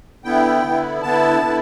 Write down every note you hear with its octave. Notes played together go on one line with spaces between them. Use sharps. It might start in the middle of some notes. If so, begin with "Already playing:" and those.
D3 B3 E4 G5
D3 B3 E4
D3 B3 E4 A5
D3 B3 E4